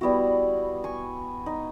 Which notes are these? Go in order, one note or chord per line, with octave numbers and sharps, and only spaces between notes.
G3 B3 E4 F#4
G#5 C#6
D#4